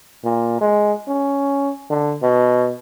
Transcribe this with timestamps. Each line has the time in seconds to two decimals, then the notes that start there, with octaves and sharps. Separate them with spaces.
0.24 A#2
0.61 G#3
1.08 C#4
1.90 D3
2.22 B2